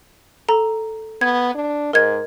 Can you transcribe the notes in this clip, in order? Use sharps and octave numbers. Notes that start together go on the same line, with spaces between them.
A4 A#5
B3 G#6
D4
G#2 A#4 D#5 G#6